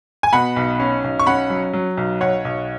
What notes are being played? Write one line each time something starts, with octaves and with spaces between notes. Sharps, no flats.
G#5
B2 F#5 B5
B1
C#4
B1
C#6
C#4 F#5 B5
F#3
F#3
B1
B1 C#5 F#5
B1